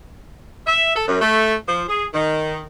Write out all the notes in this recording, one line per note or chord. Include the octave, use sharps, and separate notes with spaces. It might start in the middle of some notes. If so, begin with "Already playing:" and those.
E5
A4
F#2
A3
F3
G#4
D#3